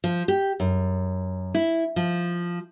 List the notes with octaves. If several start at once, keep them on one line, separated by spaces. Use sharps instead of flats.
F3
G4
F#2
E4
F3